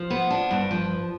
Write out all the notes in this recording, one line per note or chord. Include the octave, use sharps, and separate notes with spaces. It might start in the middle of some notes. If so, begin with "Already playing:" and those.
Already playing: F3 C5
B3
D4
G2
F3